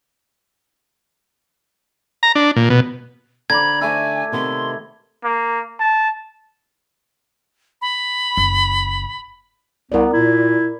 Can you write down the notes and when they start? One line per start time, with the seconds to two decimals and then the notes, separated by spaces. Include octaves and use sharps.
2.23 A#5
2.35 D4
2.56 A#2
2.70 B2
3.50 D3 D5 A#5 B5 G#6
3.81 A3 E4 G#5
4.32 C3 D#3 B3 C6
5.24 A#3
5.80 A5
7.82 B5
8.37 F#1
9.92 C2 B3 A#4 D5
10.13 A#2 E4